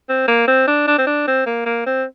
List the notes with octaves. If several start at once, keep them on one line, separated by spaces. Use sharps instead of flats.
C4
A#3
C4
D4
D4
C4
D4
C4
A#3
A#3
C4